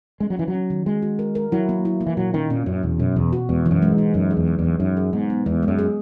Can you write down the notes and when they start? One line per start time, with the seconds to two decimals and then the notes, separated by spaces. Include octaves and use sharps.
0.20 G#3 C#4
0.30 F#3
0.37 E3 C#4
0.48 F#3
0.54 C#4
0.70 D#3
0.86 G#3 F#4
1.02 F#4
1.19 A#4
1.35 A#4
1.52 F#3 E4
1.69 A#3
1.85 E4
2.01 A#3
2.07 E3
2.17 A#2 F#3
2.34 D#3 C#4
2.50 A#2 C#4
2.66 F#2 F#4
2.83 E2 B2
2.99 F#2 B2
3.16 E2 B2
3.33 F#4
3.49 E2 G#3
3.66 E3
3.71 F#2
3.82 G#3
3.92 G#2
3.98 D#4
4.14 F#2 F#3
4.31 G#4
4.37 E2
4.47 F#3
4.59 E2
4.64 F#3
4.80 F#2 D#4
4.97 G#4
5.13 G#2 B3
5.30 B3
5.46 E2 G#3
5.63 G#3
5.68 F#2
5.79 G#4